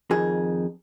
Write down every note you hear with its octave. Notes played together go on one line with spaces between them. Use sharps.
F2 D#3 G#4